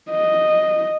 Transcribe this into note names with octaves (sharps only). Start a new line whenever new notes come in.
D#5